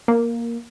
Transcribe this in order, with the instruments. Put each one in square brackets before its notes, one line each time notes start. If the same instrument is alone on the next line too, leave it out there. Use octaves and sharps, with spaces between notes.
[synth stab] A#3